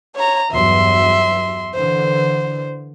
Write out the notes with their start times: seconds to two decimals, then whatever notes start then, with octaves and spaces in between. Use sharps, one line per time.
0.15 C#5 A#5
0.51 E2 G2 F#3 E5 C6
1.74 D3 E3 C5